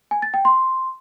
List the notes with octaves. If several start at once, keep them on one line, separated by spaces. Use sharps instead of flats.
G#5
A6
G5
C6